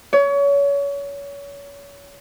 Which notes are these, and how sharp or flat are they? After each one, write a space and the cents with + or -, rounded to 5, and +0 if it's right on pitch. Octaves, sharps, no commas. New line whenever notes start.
C#5 +30